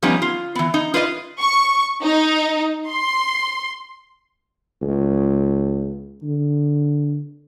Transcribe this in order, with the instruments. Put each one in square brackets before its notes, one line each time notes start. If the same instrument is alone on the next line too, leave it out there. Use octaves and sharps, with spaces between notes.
[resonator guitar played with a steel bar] F3 G3 B3 C#4 D#4
F4
E3 B3
D#4
F4 B4 D5 D#5
[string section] C#6
D#4
C6
[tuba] C#2
D3